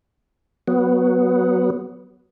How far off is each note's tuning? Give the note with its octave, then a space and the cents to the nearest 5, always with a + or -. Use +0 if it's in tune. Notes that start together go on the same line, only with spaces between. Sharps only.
F#3 +0 B3 +0